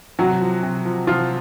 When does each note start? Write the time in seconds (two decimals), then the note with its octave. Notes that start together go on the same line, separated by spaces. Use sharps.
0.19 C3 F#3 F#4
0.41 F3
0.63 C3
0.85 F3
1.07 C3 F3 F4